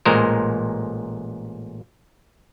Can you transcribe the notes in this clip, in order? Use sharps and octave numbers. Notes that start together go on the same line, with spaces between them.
A1 A#2 G#3 A#4 C5